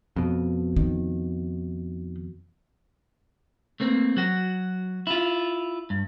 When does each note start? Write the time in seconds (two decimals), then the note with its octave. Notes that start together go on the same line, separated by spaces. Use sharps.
0.16 F2 B2
0.76 D#3
3.80 A3 A#3 C4
4.17 F#3 F#4
5.07 E4 F4
5.90 G2